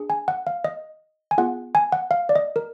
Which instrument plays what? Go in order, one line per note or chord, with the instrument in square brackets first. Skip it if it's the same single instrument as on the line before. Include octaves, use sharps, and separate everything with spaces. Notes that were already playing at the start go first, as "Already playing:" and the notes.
Already playing: [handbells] D4 G#4
G#5
F#5
F5
D#5
G#5
B3 F4 G#4 F#5
G#5
F#5
F5
D5
D#5
A#4